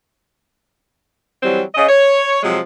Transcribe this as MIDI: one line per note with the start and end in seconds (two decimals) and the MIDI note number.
1.43 1.63 52
1.43 1.63 54
1.43 1.63 55
1.43 1.63 60
1.75 1.88 49
1.75 1.88 75
1.89 2.39 73
2.43 2.60 48
2.43 2.60 53
2.43 2.60 54
2.43 2.60 56